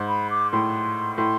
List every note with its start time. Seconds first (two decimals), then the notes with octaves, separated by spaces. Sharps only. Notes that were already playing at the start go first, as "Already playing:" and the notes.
Already playing: G#2
0.08 B5
0.30 D6
0.52 A2 C6
1.18 A2 C6